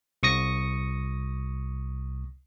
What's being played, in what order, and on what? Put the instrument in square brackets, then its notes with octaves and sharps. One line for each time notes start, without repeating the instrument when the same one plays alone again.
[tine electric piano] C2 C#6 D#6 A#6 C#7